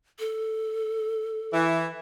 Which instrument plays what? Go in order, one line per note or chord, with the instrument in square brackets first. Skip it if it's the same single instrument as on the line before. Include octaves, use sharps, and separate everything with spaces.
[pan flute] A4
[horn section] E3